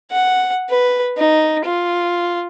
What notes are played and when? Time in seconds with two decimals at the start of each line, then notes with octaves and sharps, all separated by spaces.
0.11 F#5
0.70 B4
1.17 D#4
1.65 F4